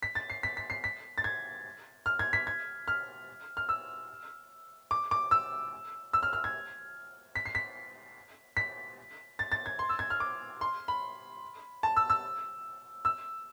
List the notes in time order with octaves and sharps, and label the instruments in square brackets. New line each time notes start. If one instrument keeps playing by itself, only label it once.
[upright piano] B6
A6
C7
B6
B6
C7
B6
A6
G#6
F6
G#6
B6
G#6
F6
F6
E6
D6
D6
E6
E6
F6
F6
G#6
B6
C7
B6
B6
A6
A6
G#6
C6
E6
G#6
F6
D6
C6
B5
A5
E6
E6
E6